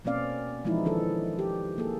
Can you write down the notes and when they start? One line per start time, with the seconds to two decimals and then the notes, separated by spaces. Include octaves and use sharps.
0.05 B2 A#3 C4 C#4 D5 F5
0.65 E3 F3 G#3 D#4 E4
0.85 D#3 D4 A4
1.39 G4
1.78 A#3 G#4 A4